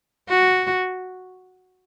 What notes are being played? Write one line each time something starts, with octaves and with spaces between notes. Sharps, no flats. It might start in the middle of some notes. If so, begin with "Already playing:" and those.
F#4